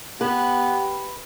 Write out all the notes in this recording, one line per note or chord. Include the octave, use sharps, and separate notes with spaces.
B3 G4 B4